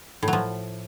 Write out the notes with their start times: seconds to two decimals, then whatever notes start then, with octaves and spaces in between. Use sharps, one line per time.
0.23 A2
0.28 F#3
0.33 F3